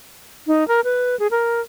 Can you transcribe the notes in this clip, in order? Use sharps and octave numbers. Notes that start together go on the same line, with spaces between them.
D#4
A#4
B4
G#4
A#4